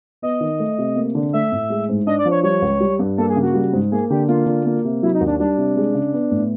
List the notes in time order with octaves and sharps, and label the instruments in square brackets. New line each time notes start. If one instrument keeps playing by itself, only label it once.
[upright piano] B3 [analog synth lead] D#5
[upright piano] D#3
A3
C3
A#3
D3
[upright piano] A3 [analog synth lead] E5
[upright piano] A2
G#3
G#2
[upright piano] D4 [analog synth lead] D#5
[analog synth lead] D5
[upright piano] F3
[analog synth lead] C#5
[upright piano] G3 [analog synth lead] C#5
[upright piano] C#2
G3
G2
[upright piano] A#3 [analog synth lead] A4
[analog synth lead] G#4
[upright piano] C#3
[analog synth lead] F#4
[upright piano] G3
G#2
[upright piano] A#3 [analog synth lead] G#4
[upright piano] D3 [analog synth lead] G4
[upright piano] A#3 [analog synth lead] F4
[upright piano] D3
A#3
C3
[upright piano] F#3 [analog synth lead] E4
[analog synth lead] D#4
[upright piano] D#2
[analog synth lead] D4
[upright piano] G3 [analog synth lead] D4
[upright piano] C3
G#3
C#3
B3
A2